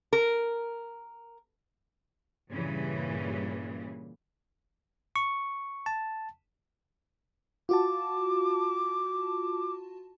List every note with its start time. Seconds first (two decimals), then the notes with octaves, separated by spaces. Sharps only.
0.13 A#4
2.51 G2 A#2 C#3 E3 G3
5.16 C#6
5.86 A5
7.69 F4 F#4 A5 D6